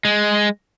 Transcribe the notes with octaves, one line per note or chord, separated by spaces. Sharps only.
G#3